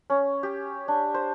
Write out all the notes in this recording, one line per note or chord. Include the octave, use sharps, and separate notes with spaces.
C#4
G4
D4
C5